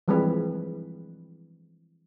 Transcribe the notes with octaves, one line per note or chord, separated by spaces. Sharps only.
E3 F3 G3 G#3 C4 B4